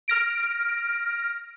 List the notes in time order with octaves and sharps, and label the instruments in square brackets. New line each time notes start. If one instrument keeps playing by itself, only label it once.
[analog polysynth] F6 A#6 D7